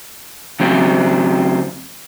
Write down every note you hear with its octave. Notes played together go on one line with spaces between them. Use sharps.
C#3 F#3 C4